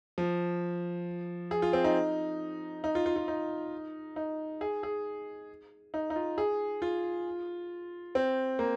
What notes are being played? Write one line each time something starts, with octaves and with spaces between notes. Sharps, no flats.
F3
G#4
F4
C4
D#4
D#4
F4
F4
F4
D#4
D#4
G#4
G#4
D#4
D#4
F4
G#4
F4
C4
A#3